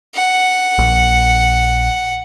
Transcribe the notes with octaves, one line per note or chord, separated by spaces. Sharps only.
F#5
A#1